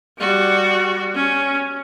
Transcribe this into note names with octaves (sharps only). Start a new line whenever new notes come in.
G3 F#4
C#4